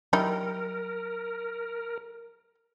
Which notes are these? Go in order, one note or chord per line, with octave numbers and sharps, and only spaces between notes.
F#3 G3 D#4 E4 A#4